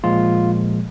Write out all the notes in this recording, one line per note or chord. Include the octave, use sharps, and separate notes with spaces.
A#2 F3 G#3 F4